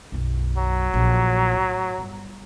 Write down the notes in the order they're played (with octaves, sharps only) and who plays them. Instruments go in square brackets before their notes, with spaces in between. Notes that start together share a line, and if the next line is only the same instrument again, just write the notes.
[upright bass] B1 F#2
[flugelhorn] F#3
[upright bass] A#1
A2
G1